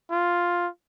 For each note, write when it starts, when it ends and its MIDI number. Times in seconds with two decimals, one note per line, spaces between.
0.11 0.68 65